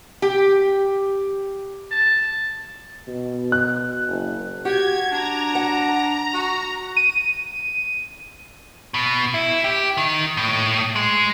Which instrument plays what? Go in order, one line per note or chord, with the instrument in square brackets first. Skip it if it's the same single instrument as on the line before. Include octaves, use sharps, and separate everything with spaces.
[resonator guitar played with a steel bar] G4
[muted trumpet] A5
[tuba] B2
[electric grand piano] F#6
[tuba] F#1
[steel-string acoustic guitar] F#4 [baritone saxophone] G4 [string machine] G#6
[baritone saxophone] D4 [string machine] A#5
[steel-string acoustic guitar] F#5
[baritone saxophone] F#4
[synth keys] D#7
[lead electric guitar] B2
E4
G4
D#3
A2
G#3